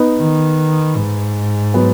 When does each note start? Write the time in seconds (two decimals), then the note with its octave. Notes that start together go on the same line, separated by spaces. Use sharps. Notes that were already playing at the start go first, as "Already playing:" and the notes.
Already playing: B3 D#4
0.18 D#3
0.96 G#2
1.74 F#3 B3